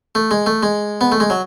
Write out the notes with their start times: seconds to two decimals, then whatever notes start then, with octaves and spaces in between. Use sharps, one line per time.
0.15 A3
0.31 G#3
0.46 A3
0.63 G#3
1.01 B3
1.12 A3
1.20 G#3
1.30 F#3